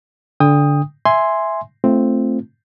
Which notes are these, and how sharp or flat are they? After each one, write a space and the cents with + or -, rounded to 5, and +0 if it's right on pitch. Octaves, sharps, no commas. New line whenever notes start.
D3 -15 G5 +30 D#6 +0
E5 +0 G#5 +0 C6 +0
A3 +0 C4 +0 F4 -25